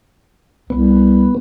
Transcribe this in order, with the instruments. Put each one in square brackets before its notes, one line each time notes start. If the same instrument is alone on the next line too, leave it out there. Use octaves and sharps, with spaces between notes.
[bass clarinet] C2 [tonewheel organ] B3